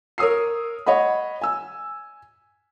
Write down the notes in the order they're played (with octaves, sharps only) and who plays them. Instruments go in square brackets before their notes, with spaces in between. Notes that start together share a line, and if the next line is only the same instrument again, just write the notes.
[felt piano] A#4 C#5 D#6 E6 C7
C#5 D#5 F#5 B5
G#5 E6